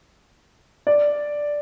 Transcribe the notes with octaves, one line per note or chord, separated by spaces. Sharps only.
D5